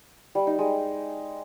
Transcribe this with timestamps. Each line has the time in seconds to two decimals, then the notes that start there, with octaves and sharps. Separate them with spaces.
0.35 G3
0.47 D#4
0.59 G#3